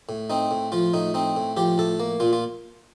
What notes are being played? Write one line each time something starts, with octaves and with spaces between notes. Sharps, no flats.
A2
C4 D#4
A2
F3 F4
A2 D#4
C4 D#4
A2
F3 G4
A2 A4
A#3
A#2 F4
F4